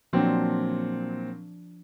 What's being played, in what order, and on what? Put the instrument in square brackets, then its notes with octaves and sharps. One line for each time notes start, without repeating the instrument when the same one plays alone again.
[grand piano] A#2 F#3 C4 [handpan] F3 D4